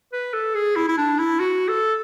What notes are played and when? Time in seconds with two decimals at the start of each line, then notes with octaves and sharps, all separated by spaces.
0.13 B4
0.33 A4
0.55 G#4
0.76 E4
0.89 E4
0.98 D4
1.19 E4
1.40 F#4
1.68 A4